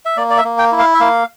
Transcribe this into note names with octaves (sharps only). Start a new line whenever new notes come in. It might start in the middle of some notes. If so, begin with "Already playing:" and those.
E5
A#3 D5
D5
E5
A#3
G5
E4
F5
E5
A#3 F5